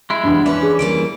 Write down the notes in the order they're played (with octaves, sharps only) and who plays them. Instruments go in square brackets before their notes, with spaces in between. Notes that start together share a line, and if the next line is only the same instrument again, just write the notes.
[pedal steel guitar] G#3 E4
[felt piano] E2 G2
[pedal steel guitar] E3 C#4 [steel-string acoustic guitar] F3 B4 [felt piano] D4
[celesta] G#4
[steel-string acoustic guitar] F3 G3 A#3 [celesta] D7